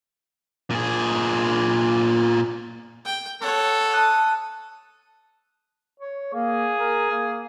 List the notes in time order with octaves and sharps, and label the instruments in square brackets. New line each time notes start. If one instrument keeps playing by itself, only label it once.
[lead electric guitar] A#2 G#4
[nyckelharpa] G5
[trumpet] A4 [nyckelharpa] C#5 F#5
[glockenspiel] A5 F#6 [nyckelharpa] D#6
[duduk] C#5
[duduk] A#3 [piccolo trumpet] G#4
[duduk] A#4
A#3